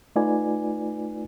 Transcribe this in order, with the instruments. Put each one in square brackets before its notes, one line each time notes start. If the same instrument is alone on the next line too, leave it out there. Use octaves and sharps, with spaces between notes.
[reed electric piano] A3 D#4 F4 B4 D5 G#5